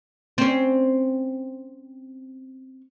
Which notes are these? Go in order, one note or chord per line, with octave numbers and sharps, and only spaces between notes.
C4 C#4